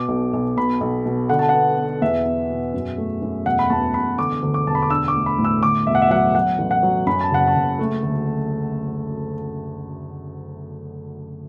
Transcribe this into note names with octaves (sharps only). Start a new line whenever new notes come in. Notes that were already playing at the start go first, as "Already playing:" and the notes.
Already playing: B2 D6
B1
B1
B2 B5
B1
B2
D3 F#5
A5
B3 F#5
B3
E2 E5
B3
B2
F#2
A3
F#2
E1 F#5
B5
E2 A5
E1 B5
D3 D6
D2
D6
E1 A5
B5
D6
D4 E6
D6
A3
B5
A2
E6
D3 D6
E1 E5
F#5
E5
F#3 F#5
F#3 F#5
A1
F#5
F#3
F#2 B5
A5
F#1 F#5
A5
F#1
A3
D2